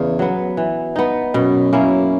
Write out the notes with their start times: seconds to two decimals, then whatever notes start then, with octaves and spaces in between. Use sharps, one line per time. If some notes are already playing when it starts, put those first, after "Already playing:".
Already playing: E2 C#3
0.19 F#3 B3
0.57 E3
0.96 B3 D#4
1.34 F#2 B2
1.73 A#3 C#4 E4